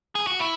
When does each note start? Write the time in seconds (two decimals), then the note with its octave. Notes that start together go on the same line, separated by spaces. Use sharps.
0.15 G#4
0.27 F#4
0.40 E4